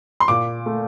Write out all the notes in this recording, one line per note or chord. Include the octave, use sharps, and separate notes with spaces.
C6
A#2 D6
A3